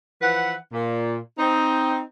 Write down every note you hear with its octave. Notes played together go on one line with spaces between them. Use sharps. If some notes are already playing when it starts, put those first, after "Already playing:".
E3 F3 B4 F#5
A#2
C4 D#4